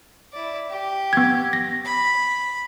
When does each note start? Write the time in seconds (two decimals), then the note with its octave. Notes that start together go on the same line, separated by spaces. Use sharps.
0.33 E4 D5
0.70 G4
1.13 B3 G#6
1.53 A#6
1.85 B5